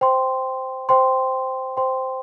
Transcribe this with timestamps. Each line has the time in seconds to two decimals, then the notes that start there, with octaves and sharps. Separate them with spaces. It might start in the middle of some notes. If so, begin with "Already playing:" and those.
0.01 C5 G5 C6
0.89 C5 G5 C6
1.77 C5 G5 C6